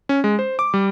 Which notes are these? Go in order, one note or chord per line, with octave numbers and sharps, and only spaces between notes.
C#4
G#3
C5
D6
G3